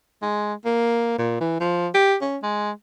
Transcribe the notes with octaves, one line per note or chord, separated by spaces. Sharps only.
G#3
A#3
A#2
E3
F3
G4
C#4
G#3